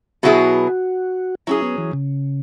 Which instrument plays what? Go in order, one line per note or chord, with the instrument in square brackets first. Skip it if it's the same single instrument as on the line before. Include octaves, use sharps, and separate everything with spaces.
[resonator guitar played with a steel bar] B2 F#3 B3 E4 G#4 [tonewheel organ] F#4
[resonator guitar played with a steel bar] F#3 C#4 G#4 [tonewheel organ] E4
[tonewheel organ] B3
E3
C#3